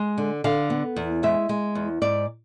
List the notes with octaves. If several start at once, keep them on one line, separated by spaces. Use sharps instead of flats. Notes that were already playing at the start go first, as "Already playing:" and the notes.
Already playing: G#3
D3
D3 F5
B3
E2
G#3 E5
G#3
E2
G#2 D5